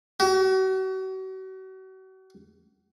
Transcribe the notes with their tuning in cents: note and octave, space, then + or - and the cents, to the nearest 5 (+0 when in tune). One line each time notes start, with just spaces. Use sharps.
F#4 +40